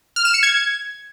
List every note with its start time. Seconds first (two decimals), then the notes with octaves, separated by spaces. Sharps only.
0.16 F6
0.25 E7
0.34 C#7
0.43 G#6